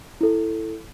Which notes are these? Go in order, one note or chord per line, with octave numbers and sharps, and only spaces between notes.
E4 A4